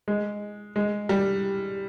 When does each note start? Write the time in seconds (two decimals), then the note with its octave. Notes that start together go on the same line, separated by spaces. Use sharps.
0.08 G#3
0.76 G#3
1.09 G3